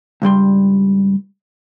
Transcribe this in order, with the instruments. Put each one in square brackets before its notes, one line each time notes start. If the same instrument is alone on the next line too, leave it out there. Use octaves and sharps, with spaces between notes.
[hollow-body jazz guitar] C#2 G2 G3 C6